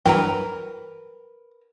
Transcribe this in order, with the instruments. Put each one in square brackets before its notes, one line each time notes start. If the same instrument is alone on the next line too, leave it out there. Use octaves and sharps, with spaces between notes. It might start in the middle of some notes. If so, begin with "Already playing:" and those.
[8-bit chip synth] G2 E3 F#3 [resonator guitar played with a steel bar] A#4 B4 [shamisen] G5 A#5